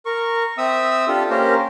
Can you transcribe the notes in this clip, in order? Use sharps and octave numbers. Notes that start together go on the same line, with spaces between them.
A#4 C#6
C4 E5 D#6 E6
D4 F4 G4 A4
A#3 C#4 G4 A#4 C5